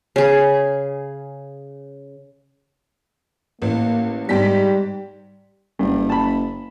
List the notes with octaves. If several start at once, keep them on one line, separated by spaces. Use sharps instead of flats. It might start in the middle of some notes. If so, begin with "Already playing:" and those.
C#3 G#4
A1 A#3
G#2 G3 G4 B6
F#1 G2
A5 B5